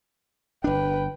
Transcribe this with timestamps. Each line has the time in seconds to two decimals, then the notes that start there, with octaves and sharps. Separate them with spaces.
0.64 G1 D4 B4 G5